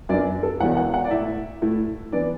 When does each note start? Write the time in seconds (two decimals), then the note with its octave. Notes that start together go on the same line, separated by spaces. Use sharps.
0.09 F#2 F#3 B3 D4 D5
0.43 A4
0.60 E1 E2 B2 F#5
0.77 F#5
0.94 F#5
1.04 D5
1.11 A2 A3 E4 E5
1.62 A2 A3 E4
2.12 E3 B3 D4 D5